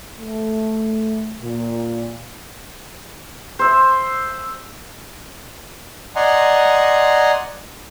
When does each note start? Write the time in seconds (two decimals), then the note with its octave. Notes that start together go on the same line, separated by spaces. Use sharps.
0.20 A3
1.41 A#2
3.59 C5 E5
6.16 D5 D#5 F#5 G#5 A#5 C6